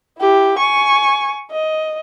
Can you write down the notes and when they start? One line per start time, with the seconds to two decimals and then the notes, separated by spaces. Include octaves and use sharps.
0.19 E4 G4
0.58 G#5 C#6
1.51 D#5